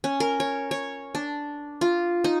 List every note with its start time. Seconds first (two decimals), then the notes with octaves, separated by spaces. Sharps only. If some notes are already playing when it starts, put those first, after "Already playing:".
0.04 C#4
0.20 A#4
0.40 C#5
0.71 C#5
1.15 D4
1.81 F4
2.24 D#4